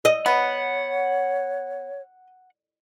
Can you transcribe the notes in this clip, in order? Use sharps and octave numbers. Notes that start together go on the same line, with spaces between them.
D#5
B3 C#5 F#5